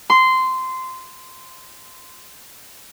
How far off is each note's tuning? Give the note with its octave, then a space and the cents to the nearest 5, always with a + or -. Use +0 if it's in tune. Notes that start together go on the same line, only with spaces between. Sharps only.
C6 -15